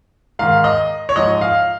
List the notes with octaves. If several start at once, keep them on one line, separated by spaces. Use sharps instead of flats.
G#2 D#3 F5
D#5
C#5
G#2 F3 D#5
F5